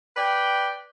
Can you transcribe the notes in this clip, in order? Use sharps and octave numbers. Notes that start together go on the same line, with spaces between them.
B4 D5 G5